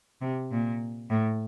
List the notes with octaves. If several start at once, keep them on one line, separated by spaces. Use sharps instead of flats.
C3
A#2
A2